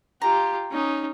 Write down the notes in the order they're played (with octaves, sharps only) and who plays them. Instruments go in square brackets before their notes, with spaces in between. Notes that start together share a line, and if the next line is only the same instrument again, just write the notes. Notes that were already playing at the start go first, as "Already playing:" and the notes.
[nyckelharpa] F4 G4 [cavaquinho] A#5
[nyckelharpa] C#4 D#4